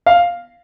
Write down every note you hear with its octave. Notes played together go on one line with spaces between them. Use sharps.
F5